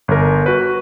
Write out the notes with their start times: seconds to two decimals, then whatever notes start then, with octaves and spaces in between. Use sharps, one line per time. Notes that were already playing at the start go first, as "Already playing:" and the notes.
0.08 G1 A#4
0.46 F#4 B4